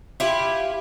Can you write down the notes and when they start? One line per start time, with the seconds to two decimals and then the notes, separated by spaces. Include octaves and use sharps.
0.20 E4 F4 G4